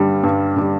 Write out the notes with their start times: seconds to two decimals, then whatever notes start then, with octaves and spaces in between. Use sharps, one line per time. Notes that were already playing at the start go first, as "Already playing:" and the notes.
Already playing: G2 D3 G3
0.23 G2
0.56 D3 G3